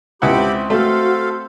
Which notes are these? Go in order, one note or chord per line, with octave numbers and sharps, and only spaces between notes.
C#2 C4 E4 G4 F#5 B5 D6
A3 F#4 A4 C5 F5